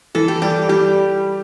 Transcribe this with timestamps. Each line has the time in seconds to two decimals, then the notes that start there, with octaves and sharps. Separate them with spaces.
0.15 E3 A4
0.28 G4
0.42 G3 G4
0.69 G3 G4